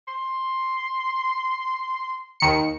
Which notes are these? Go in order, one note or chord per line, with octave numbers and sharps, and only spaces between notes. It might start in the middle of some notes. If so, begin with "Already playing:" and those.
C6
D#2 D#3 C#7